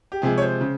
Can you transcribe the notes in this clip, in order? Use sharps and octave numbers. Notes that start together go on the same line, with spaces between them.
G4
C3 F3 G#3 G#4
C#5
C5
C#3